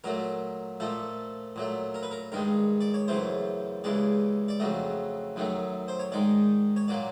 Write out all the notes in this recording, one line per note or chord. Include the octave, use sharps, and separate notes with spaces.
A#2 F#3 A3 A#4
A#2 F3 A3 A4
A#2 F#3 A3
A#4
B4
A#4
G2 D#3 G#3 A#4
D5
C#5
F#2 C#3 E3 A3 C5
D#2 C#3 E3 G#3 D5
D5
F2 C#3 F#3 A3 D#5
F#2 D#3 F#3 A3
C5
C#5
G#2 D#3 G#3 D5
C#5
A#2 F#3 A#3 D5